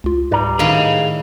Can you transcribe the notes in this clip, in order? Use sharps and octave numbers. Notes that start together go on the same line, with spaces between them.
C#2 F4
G#2 G3 B4 D5 A#5
A2 D#3 G#4 F5